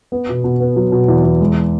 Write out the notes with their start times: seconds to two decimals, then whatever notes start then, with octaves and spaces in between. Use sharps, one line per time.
0.12 B3
0.29 B2
0.44 B2
0.60 B3
0.76 F#3
0.92 B2
1.08 E2
1.24 E2
1.41 G#3